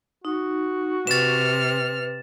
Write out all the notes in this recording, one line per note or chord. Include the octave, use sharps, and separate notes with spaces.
D#4 F#4
C3 B4 F6 A6 E7